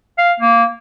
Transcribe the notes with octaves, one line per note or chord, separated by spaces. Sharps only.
F5
A#3